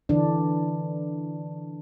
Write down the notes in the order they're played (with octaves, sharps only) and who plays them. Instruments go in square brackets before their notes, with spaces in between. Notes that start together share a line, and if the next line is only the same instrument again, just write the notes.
[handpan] D3 E3 D4